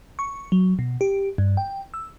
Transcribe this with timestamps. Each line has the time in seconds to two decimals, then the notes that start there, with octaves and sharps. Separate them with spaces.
0.19 C#6
0.52 F#3
0.79 B2
1.01 G4
1.38 G2
1.57 G5
1.94 E6